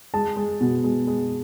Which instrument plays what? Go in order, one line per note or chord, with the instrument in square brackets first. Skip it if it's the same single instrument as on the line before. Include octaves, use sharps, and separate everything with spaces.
[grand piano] G#3 A5
G#3
B2
G#3
G#3